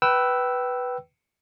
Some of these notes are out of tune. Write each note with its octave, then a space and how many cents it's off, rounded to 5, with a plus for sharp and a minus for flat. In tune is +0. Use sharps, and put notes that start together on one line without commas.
B4 +0 G5 -25 E6 +0